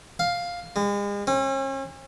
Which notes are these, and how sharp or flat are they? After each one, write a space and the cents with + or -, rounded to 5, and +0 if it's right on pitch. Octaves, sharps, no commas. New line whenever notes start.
F5 +5
G#3 -40
C#4 -40